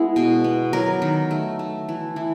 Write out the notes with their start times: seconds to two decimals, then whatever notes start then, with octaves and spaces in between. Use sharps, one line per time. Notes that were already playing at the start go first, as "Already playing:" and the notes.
Already playing: G#3 B3 E4
0.16 B2
0.44 B3
0.73 F#3 A#4
1.02 D#3
1.31 A3
1.59 A3
1.89 E3
2.16 E3